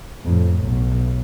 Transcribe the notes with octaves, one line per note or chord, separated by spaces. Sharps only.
F2 A2
B1